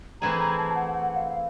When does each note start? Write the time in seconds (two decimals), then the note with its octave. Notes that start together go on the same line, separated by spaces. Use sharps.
0.22 E3 A3 C4 E4 G#4 A#5
0.40 A#5
0.58 A5
0.75 F#5
0.93 F#5
1.15 F5
1.28 F5